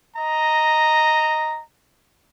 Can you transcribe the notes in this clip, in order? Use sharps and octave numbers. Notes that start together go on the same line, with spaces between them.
D#5 A#5